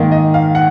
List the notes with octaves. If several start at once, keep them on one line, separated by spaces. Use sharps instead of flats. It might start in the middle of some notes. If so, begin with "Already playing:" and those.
Already playing: G#2 D#3 A#3
D#5
F5
F#5